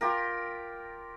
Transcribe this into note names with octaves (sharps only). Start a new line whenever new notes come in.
F4 G4 A#4